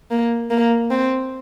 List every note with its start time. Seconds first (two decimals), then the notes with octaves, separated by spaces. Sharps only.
0.11 A#3
0.50 A#3
0.91 C4